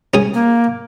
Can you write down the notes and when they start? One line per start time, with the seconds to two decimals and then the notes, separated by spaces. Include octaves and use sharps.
0.14 C#4 G#4 G#5
0.34 A#3